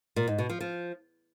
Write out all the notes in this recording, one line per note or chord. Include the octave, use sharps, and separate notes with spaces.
A#2
G#2
B2
F3
F3